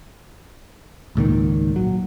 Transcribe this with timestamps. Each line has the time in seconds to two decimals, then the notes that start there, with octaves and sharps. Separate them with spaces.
1.15 G#1 C#2 A#2 D#3
1.76 F#3